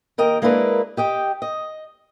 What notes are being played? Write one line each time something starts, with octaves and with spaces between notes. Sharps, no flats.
D#2 A#4 D#5 G5
G#3 A#3 D4 E4 A#4 B4
G4 D#5 G5
D#5